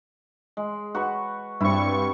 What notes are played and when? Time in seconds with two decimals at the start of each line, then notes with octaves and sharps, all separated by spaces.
0.57 G#3
0.95 F#4 B4 C#6
1.60 G2 C4 E4 C#6